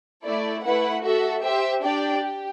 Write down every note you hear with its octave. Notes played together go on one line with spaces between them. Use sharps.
A3 E4 A4 D5
A3 E4 B4 F#5
F#4 A4 E5
G4 C5 E5
D4 G4 D5 G5
G4